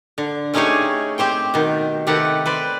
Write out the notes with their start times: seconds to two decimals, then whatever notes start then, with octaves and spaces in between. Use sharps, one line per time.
0.18 D3
0.54 A3 C#4 D#4 G4 G#4 C#5
1.18 C4 G4 C5 G5
1.54 B2 D#3
2.07 C3 D#3 G4 A4 B4 F#5
2.46 B4 C5 D5